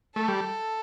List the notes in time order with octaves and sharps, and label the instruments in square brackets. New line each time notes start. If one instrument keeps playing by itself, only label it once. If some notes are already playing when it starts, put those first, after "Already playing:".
[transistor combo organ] A3 [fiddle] A4
[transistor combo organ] G3